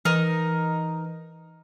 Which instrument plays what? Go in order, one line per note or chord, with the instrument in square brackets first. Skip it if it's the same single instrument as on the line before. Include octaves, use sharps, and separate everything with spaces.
[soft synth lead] E3 [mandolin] D#4 A#4